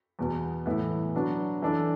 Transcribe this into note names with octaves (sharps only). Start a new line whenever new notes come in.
E2 B2 B3
A2 E3 B3
B2 F#3 B3 D4
E3 D4 A4